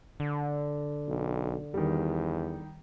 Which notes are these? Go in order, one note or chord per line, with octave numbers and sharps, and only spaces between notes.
D3
B1
E2 D#3 G3